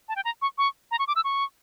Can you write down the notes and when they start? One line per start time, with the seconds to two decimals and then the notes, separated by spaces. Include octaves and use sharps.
0.09 A5
0.16 G5
0.25 A#5
0.42 C#6
0.58 C#6
0.91 A#5
0.99 C#6
1.08 D6
1.16 E6
1.24 C#6